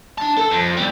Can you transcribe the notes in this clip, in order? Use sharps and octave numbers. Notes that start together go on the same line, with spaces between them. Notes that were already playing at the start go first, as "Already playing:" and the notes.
D4 A5
A4 A5
F2
E2 G3